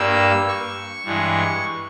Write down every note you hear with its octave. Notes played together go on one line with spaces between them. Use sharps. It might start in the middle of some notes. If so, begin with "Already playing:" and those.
Already playing: G2 G3 A#3 E6
C#6
G2 E3 G#3